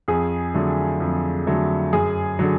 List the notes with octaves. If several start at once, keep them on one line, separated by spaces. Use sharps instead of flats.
F2 G#4
D3 F#3 A3
F2
D3 F#3 A3
F#2 G#4
D3 F#3